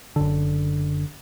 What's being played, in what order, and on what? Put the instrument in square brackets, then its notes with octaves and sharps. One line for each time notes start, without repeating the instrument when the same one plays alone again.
[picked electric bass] F#1 D3